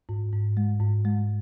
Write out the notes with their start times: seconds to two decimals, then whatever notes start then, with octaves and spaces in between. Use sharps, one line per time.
0.09 G#2
0.32 G#2
0.57 G#3
0.80 G#2
1.05 G#3